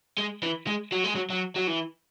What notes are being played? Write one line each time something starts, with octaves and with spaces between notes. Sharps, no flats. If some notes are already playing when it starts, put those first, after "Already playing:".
G#3
E3
G#3
F#3
G#3
F#3
F#3
F#3
E3